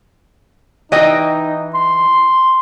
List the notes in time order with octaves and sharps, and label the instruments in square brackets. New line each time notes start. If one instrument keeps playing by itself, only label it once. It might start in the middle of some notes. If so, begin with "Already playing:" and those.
[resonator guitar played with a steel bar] E3 D#5 G5 [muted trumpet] D#4
[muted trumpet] C6